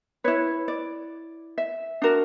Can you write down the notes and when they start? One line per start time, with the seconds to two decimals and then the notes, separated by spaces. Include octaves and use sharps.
0.24 E4 B4 C#5
0.68 D5
1.58 E5
2.02 D4 F#4 A#4